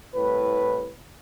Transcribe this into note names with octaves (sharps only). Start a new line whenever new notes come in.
C2 A2 B4